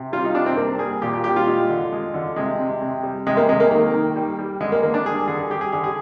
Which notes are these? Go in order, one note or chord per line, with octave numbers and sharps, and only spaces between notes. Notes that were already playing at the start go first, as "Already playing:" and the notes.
Already playing: C3
G3 F4
D#4
C3 D4
C4
G3 A#3
G3 G#4
A#2 G4
G4
G3 G4
F4
G#3
D3
G#3
D3
C3 G#3
C3
C3
G3
C3 G#3
A#3
C3 G#3
A#3
D#3 A#3
D#3
G3
G3
D3 G#3
A#3
D3 A#3
D4
G3 G#4
D3 G#4
G3 G4
G#4
D3 G#4
G#4